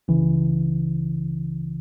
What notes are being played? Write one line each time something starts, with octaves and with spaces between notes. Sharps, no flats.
C#2 C#3 E3